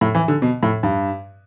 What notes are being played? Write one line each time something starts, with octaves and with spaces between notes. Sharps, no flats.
A2
E3
D3
B2
A2
G2